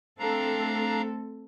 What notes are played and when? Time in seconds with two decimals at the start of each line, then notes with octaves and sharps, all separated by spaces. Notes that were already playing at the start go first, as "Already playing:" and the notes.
0.19 A3 C4 D4 A4 F5 A#5